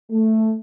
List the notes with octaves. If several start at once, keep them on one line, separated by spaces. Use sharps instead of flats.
A3